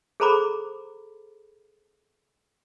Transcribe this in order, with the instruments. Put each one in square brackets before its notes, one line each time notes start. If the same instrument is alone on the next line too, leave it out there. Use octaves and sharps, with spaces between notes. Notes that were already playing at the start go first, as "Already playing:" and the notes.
[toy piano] G#4 A4 C5 A#5 B5 D6